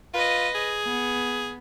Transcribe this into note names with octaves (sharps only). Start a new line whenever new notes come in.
F4 B4 D#5
G#4
B3